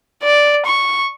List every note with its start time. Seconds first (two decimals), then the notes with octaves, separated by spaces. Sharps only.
0.23 D5
0.66 C#6